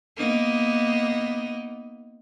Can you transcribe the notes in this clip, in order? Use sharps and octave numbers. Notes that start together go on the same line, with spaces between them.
A#3 B3 D#4